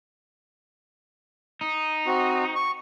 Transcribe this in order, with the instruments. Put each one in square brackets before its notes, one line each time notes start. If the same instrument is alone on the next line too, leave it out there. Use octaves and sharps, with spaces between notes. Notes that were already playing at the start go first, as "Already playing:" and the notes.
[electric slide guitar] D#4
[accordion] C4 F#4
C#6